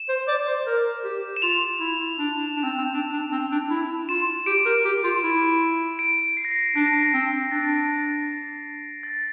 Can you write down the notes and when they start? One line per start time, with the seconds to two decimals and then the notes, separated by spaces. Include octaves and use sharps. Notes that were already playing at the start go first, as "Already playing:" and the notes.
Already playing: E7
0.09 C5
0.28 D5
0.48 C5
0.67 A#4
1.04 G4
1.36 E7
1.42 F4 F7
1.80 E4
2.19 D4
2.56 D4
2.64 C4
2.78 C4
2.94 D4
3.13 D4
3.32 C4
3.52 D4
3.70 E4
4.09 F4 E7
4.46 G4 D7
4.66 A#4
4.85 G4
5.04 F4
5.24 E4
5.99 D7
6.37 C7
6.45 A#6
6.51 C7
6.76 D4 A#6
6.85 C7
6.94 A#6
7.14 C4
7.51 D4 A6
9.03 A6